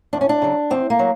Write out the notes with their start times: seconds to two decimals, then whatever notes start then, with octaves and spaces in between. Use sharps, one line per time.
0.13 E2 D4
0.21 C#4
0.29 D4
0.42 C#3 F#3
0.70 E2 C4
0.90 A#3
0.99 F#3